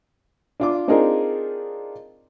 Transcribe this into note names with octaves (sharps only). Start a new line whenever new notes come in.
D4 F4 D6
C4 D4 D#4 F4 G#4 A#4